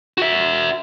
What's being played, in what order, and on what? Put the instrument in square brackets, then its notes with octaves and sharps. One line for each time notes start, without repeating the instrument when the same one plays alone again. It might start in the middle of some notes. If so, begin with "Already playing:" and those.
[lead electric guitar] F#4 E5